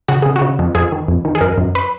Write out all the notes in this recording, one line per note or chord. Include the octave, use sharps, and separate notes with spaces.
C#3 F#4
C#3 G#4
F#4
C#3
F2
F2 G#4
D#3
F2
D#3
G#4
F#2 A#4
F#2
B4